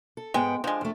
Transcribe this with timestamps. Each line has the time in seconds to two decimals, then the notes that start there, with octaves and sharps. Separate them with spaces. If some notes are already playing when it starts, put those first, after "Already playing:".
0.17 A4
0.34 G#2 G#3 B3 G5
0.64 F3 G#3 D4
0.81 F2 A3